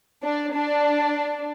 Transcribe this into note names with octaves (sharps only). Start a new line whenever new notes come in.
D4
D4